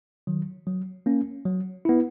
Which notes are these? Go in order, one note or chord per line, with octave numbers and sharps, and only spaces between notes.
D#3 F#3
F#3
A#3 C#4
F#3
B3 E4